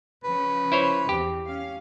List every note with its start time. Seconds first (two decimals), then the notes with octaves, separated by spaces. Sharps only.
0.24 C#3 F3 C#4 B4
0.72 E4 C5 C#5
1.09 E2 C4 G4
1.47 C#4 F5